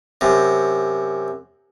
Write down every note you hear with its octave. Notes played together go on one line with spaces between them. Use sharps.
F#2 C3